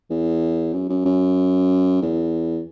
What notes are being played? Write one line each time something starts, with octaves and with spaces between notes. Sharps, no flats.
E2
F#2
F#2
F#2
E2